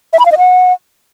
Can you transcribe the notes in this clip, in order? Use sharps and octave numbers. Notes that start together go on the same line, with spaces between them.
E5
B5
F5
D#5
F#5